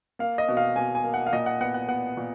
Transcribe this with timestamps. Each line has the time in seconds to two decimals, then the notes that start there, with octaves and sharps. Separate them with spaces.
0.19 A#3 F5
0.38 D#5
0.48 B2
0.57 F5
0.76 B2 G#5
0.95 G#5
1.04 A#3
1.14 F#5
1.27 F5
1.33 A#2 D#5
1.46 F#5
1.61 B3 F#5
1.74 F#5
1.88 B3 F#5
2.17 A#2